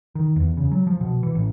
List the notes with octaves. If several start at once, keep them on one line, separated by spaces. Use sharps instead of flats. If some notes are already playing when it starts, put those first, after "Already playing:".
D#3
E2
C#3
F#3
F3
B2
E3
A1